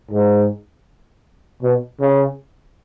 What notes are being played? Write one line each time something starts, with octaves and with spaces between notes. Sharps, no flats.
G#2
B2
C#3